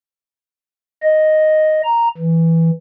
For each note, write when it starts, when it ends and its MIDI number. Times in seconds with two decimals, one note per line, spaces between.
1.03 1.82 75
1.84 2.08 82
2.18 2.71 52